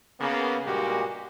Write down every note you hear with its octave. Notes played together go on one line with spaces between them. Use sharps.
C#3 A#3 B3
G2 A#2 G#3 A#3 F#4 G4